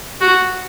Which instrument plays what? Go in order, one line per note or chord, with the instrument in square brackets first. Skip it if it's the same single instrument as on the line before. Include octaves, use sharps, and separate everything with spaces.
[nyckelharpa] F#4